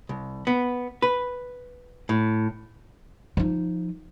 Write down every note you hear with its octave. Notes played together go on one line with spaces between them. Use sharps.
C2
B3
B4
A2
F3 D#4